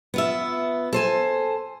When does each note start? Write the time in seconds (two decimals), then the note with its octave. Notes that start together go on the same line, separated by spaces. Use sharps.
0.14 B3 F4 E5
0.93 A4 C5 G#5